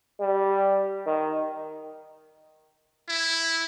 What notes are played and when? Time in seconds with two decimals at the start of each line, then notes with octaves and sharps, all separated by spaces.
0.20 G3
1.06 D#3
3.09 E4